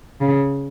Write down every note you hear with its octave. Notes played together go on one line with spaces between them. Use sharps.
C#3